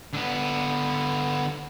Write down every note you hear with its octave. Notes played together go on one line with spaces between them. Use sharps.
D3 B3